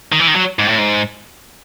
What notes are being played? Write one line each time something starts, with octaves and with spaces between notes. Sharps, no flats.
D#3
E3
D#3
F#3
G#2
A2
G#2